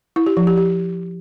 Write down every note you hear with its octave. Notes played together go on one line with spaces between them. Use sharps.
E4
G4
F3
G4
G4